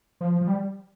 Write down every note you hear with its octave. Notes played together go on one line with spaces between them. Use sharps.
F3
F3
G3